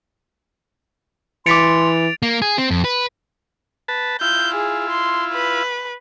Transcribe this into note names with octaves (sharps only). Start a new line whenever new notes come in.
E3 C6 D6 A6 B6 C#7 D7 F7
A#3
G#4
C4
F2
B4
B4 A5
E4 F4 G6
G#4
C6
B4